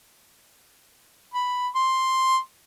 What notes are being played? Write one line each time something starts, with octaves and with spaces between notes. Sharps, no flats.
B5
C6